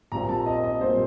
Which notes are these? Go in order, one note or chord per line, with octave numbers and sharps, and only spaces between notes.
A#1 A#2 G3 C4 F4 A#5
A5
D#5
D#5
A#2 G3 C4 F4 C5